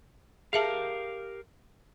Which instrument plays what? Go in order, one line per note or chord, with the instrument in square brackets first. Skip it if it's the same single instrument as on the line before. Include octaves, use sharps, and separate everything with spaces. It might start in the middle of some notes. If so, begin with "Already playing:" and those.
[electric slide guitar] G4 A#4 F5 [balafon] G#4 E5 A5